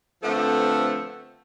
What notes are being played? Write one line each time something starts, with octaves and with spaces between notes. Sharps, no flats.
D3 F3 A3 B3 C4 A4